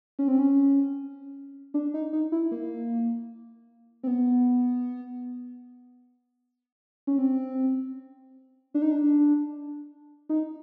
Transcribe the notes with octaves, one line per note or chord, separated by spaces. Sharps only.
C#4
C4
C#4
D4
D#4
D#4
E4
A#3
C4
B3
C#4
C4
D4
D#4
D4
D#4